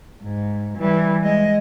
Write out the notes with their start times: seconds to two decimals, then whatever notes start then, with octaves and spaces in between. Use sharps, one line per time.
0.23 G#2
0.78 E3 G3
1.23 G#3 D#5